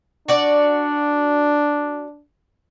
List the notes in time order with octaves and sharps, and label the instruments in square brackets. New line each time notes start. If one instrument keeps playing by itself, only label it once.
[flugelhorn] D4 [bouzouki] F#4 D5